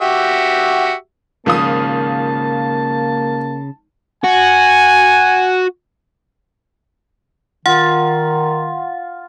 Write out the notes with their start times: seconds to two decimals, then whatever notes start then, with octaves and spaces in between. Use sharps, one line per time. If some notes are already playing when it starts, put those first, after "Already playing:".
0.02 F#4 G4 E5
1.46 G#1 C#3 F3 A#3 A5 D#6
4.24 F#4 G#5
7.66 D#3 F4 F#5